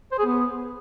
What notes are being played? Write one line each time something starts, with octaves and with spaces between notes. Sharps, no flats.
C5
G#4
B3